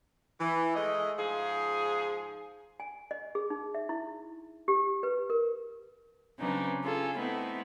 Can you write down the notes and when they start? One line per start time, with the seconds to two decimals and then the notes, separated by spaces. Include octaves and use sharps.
0.40 E3
0.75 G#3 A3 D#5
1.18 G#2 F3 G#4
2.80 G#5
3.11 D#5
3.35 G#4
3.50 D#4
3.75 E5
3.89 E4
4.68 G4
5.03 B4
5.30 A#4
6.38 C#3 F#3 C4 D4 D#4 B4
6.84 C#4 F4 G#4 A4
7.16 A3 B3 C4 D#4 E4